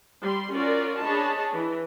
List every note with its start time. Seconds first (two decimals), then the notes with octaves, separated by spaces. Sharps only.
0.22 G3 C6
0.55 C#4 F4 F#4 A#4 D5
1.04 D4 G#4 C#5 D#5 A5 B5
1.54 E3